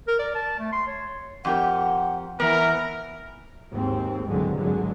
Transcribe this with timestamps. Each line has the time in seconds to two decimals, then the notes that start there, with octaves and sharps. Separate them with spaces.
0.08 A#4
0.19 D5
0.35 A5
0.58 A3
0.73 C6
0.87 C#5
1.45 F2 G4 A#4 F#5
2.40 E3 B3 A#4
3.73 D#2 G#2 C4
4.28 C2 G2 D3 F#3 G#3
4.57 G#1 D3 F#3 G#3